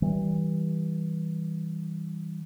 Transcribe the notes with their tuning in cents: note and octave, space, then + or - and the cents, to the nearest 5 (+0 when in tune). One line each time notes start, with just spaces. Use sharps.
E3 -25 G3 -15